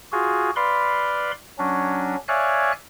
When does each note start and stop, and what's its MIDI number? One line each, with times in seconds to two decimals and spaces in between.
0.12 0.51 65
0.12 0.51 66
0.12 0.51 68
0.56 1.31 71
0.56 1.31 74
0.56 1.31 77
0.56 1.31 83
0.56 1.31 84
1.59 2.16 54
1.59 2.16 61
1.59 2.16 62
2.28 2.72 73
2.28 2.72 74
2.28 2.72 76
2.28 2.72 77
2.28 2.72 80
2.28 2.72 90